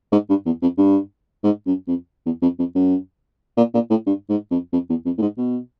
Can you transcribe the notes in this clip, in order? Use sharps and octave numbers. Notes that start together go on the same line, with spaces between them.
G#2
G2
E2
F2
G2
G#2
F#2
F2
E2
F2
F2
F#2
A#2
A#2
A2
G2
G#2
F2
F2
E2
F2
A2
G#2
B2